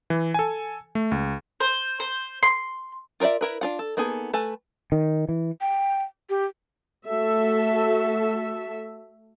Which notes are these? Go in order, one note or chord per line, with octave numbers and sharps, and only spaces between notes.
E3
A4 G#5
A3
C#2
C5
C5
C6
F4 A#4 C#5 D5 E5
E4 A#4 B4
D4 F4 F#5
A4
A#3 B3 D#4 G#4 A4
A3 A4 B4 G#5
D#3
E3
G5
G4
A3 F#4 A4 E5